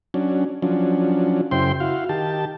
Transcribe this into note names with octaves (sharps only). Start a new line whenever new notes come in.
F#3 C#4 D4
F3 F#3 C#4 D4
F#2 C#3 E4 C5 G5 C6
E4 F#4 F5
D#3 G4 A5